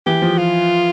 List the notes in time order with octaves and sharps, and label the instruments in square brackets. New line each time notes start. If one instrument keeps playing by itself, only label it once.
[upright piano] E3 [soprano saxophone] G4
[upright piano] F3
[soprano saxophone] F4